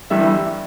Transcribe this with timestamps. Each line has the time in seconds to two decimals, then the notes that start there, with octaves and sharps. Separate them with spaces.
0.10 G1 G2 E3 G3 E5